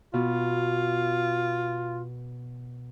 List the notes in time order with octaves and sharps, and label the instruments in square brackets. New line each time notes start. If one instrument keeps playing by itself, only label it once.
[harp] B2 [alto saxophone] F4